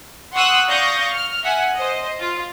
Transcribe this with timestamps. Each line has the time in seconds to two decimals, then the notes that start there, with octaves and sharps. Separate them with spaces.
0.33 F#5 C6 C#6 D#6 E6 F#6
0.67 D5 F5 C#6 D#6 G6 A#6
1.13 F6
1.43 E5 F#5 G#5
1.75 C5 D#5
2.19 F4